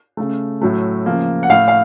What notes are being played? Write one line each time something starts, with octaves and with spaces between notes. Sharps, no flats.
C#3 A3
A2 F#3 A3
C#3 F3 A#3
F#5
A2 A3 F5
F5